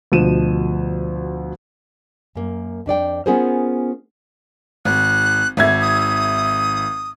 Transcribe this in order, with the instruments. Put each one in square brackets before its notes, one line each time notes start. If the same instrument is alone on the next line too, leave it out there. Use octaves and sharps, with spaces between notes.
[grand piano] D2 B2 F3 D#7 E7
[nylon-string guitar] F#2 A#3
F2 D4 D5 G5
B3 C#4 F4 G#4 A#4 C5
[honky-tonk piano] G#1 [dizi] F#6
[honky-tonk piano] G#1 E5 G#6
[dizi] D#6